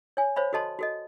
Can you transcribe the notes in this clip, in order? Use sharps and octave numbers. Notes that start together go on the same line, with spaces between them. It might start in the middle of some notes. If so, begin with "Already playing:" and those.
C#5 G#5
C5 C#5 F5 B5
F#4 A4 D#5 A5 C6
F#4 A4 D#5